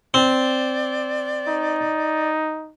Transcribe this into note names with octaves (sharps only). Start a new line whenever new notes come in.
C4 D5
D#4